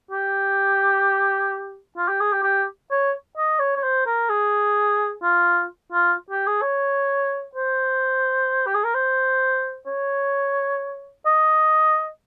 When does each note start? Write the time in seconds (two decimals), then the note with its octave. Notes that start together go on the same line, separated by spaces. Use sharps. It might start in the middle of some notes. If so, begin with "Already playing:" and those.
0.11 G4
1.97 F4
2.08 G4
2.20 G#4
2.32 G4
2.43 G4
2.91 C#5
3.37 D#5
3.59 C#5
3.77 C#5
3.83 C5
4.06 A#4
4.30 G#4
5.23 F4
5.92 F4
6.30 G4
6.47 G#4
6.62 C#5
7.55 C5
8.66 G4
8.75 G#4
8.84 A#4
8.94 C5
9.87 C#5
11.26 D#5